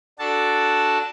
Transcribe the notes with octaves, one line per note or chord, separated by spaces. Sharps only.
D4 F#4 A4 A5